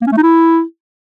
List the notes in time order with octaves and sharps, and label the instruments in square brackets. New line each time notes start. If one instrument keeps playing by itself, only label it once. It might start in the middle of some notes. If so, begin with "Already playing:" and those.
[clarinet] A#3
C#4
A3
D#4
E4